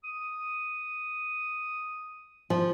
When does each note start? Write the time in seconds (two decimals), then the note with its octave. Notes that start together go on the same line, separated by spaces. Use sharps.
0.04 D#6
2.50 F3